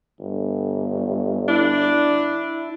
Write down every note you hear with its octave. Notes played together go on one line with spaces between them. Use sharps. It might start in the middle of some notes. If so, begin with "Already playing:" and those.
G1
D4 E4